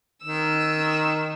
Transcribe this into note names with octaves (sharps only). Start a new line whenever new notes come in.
D#3 E6